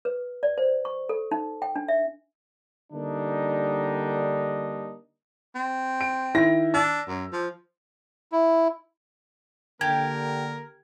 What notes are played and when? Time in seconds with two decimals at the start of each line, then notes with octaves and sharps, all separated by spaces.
0.05 B4
0.43 D5
0.58 C5
0.85 C#6
1.09 A4
1.31 D#4
1.62 G5
1.76 D4
1.88 E5
2.93 D3 G3 A#3 D4 D#4
5.55 C4
6.01 D7
6.34 D#3 E4 A#6
6.74 D4 E6
7.08 F#2
7.33 F3
8.32 E4
9.81 D3 A#3 G4 A#4 G#6